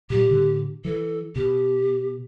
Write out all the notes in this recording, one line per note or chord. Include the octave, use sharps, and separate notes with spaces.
A#2 G3 G4
A2 D3
E3 A4
B2 G4